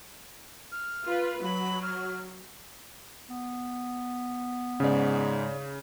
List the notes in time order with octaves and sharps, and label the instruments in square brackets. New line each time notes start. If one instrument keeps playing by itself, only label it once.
[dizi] F6
[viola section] F4 B4
[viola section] F#3 [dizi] B5
[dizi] F6
[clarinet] B3
[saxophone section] G#2 [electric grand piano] C#3 [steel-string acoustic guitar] C#4 D5